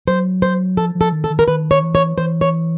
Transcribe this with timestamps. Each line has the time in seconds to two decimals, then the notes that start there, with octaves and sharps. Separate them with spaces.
0.08 F#3 C5
0.42 C5
0.77 F3 A4
0.95 F3
1.01 A4
1.12 D#3
1.24 A4
1.30 D#3
1.39 A#4
1.47 D#3 B4
1.71 C#5
1.82 E3
1.95 C#5
2.17 E3 C5
2.41 C#5